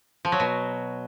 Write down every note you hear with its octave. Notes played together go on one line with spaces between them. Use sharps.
F3
F#3
B2